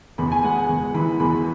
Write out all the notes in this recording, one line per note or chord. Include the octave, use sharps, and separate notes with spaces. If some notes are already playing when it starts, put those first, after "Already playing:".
E2 B5
G#5
G#3 F#5
G#5
E2
E3 B5
E2 B5